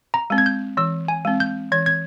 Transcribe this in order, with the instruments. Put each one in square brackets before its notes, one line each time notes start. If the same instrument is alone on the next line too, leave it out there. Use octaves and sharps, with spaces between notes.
[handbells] A#5
[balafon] G#3 C4
[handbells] G#6
G6
[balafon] E3 [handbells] E6
[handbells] G#5
[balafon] G#3 C4
[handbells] G6
[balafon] E3 [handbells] G#6
[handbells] G#6